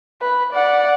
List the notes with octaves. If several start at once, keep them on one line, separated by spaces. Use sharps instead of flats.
B4
D5 F#5